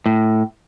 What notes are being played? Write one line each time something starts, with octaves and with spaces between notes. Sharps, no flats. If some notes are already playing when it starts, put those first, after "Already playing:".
A2